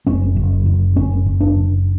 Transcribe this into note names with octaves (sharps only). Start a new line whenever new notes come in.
F#1 C#4
F#1
F#1
F#1 C#4
F#1
D4
F#1